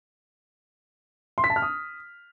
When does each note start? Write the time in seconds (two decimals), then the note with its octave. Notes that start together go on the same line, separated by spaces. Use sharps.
1.38 C6
1.44 B6
1.50 A5
1.56 F6
1.62 D#6